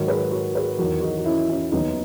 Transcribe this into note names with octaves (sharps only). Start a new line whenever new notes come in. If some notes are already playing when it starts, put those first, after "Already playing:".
Already playing: G#2 D#3 F#3 F#4 A#4
G#4 B4
F#4 A#4
G#4 B4
E2 D#3 F#3 F#4 A#4
D#4 F#4
F#4
C#4 E4
C#4 E4
D#2 D#3 F#3 B3 D#4